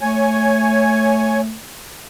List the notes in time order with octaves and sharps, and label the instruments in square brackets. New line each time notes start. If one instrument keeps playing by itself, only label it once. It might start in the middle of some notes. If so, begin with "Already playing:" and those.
[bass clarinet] A3 [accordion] C#5 G#5